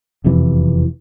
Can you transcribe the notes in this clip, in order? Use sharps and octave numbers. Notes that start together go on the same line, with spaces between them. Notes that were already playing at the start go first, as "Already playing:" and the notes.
E1 F2 C3 E3